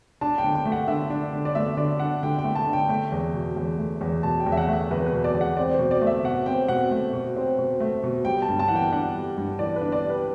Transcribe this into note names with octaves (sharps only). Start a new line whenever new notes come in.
D4 A5
G5
D3
G5
A3
F#5
D3 E5
D4
D3
D5
A3 E5
D3 D5
D4 F#5
D3 G5
G5
A3
A5
D3
G5
A3 G5
E2
B2
E2
A3
E2
B2 A5
G5
E2
E5
F#5
A3
E5
E2 B4
B4
B2
D5
E2
F#5
C4 D5
B2 C5
D5
A3
E5
B2 F#5
C4 G5
B2 F#5
A3
B2
C4
B2
A3
B2
G3 G5
A5
G2
A5
E3 F#5
G5
D4 F#5
G3
G2
E3 D5
B4
D4
D5
G3
B4